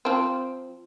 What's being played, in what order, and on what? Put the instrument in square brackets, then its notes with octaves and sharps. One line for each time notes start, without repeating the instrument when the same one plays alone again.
[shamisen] F3 C4